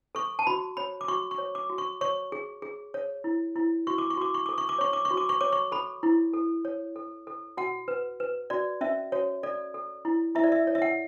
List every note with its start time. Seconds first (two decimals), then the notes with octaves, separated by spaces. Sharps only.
0.15 A4 C#6
0.39 A5
0.47 F#4 B5
0.77 C#5 B5
1.01 D6
1.08 F#4 C#6
1.31 C#6
1.38 C#5
1.55 D6
1.69 F#4
1.78 C#6
2.01 C#5 C#6
2.32 G#4
2.62 G#4
2.94 C#5
3.24 E4
3.56 E4
3.87 F#4 C#6
3.98 D6
4.10 C#6
4.17 F#4 D6
4.34 C#6
4.46 A4 D6
4.58 C#6
4.69 D6
4.79 C#5 C#6
4.93 D6
5.05 C#6
5.11 F#4
5.17 D6
5.29 C#6
5.41 C#5 D6
5.52 C#6
5.72 A4 B5
6.03 E4
6.33 A4
6.65 C#5
6.96 A4
7.27 A4
7.57 F#4 F#5
7.88 B4
8.20 B4
8.50 F#4 D5
8.81 C#4 E5
9.12 F#4 C#5
9.43 A4 D5
9.74 A4
10.05 E4
10.35 E4 E5
10.44 D5
10.52 E5
10.67 C#5
10.75 E5
10.82 F#5